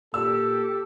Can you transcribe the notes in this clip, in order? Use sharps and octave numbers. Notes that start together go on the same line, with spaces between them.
A#2 G4 A4 E6